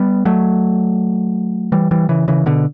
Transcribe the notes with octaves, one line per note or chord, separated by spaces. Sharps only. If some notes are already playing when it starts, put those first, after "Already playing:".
Already playing: G3 B3
F#3 A3
E3 G3
E3 G3
C#3 E3
C#3 E3
B2 D3